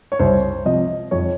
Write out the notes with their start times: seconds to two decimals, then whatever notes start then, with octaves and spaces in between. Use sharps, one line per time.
0.12 C#5
0.19 C2 C5
0.65 C3 F3 D#5
1.11 F2 C#5